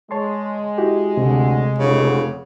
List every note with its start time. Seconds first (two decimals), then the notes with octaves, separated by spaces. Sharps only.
0.11 G#3 C#5 A5 C6
0.78 E4 F#4 G4
1.17 D2 C3
1.79 F1 C#3